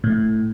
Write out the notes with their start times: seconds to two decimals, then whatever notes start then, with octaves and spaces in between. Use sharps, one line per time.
0.04 A2